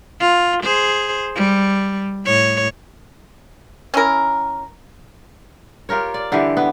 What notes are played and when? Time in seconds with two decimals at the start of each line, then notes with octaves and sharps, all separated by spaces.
0.20 F4
0.63 G#4 C5
1.36 G3
2.25 A2 C#5
3.94 C#4 E4 A#4
5.89 F4 G4 A#4 C#5
6.14 D5
6.32 D3 E3 G3 G4
6.57 B3